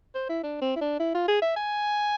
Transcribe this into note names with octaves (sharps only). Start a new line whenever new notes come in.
C5
E4
D4
C4
E4
D4
E4
F4
G#4
E5
G#5